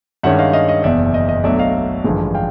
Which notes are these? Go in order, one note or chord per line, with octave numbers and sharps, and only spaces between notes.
G2 D#3 G#3 C#4 E5 F#5
D#5 F5
D#5 F5
D#5
F#1 E2 B2 D5 E5
D#5
D#5
B1 B2 F#3 A3 D4 D5 E5
D#5 F5
A1 G2 D3 F3 G#3
F5 G5